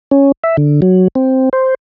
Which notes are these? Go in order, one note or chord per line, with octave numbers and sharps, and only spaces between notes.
C#4
E5
D3
F#3
C4
C5